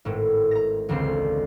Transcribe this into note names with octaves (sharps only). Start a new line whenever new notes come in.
G#1 A2
A#5 A#6
E1 C#2 D3 C4 C7